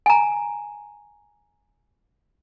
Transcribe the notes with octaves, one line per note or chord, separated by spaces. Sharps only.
G#5 A#5